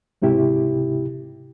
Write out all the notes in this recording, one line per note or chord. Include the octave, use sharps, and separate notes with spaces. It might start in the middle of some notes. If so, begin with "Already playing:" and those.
C#2 G#2 C3 E4 G4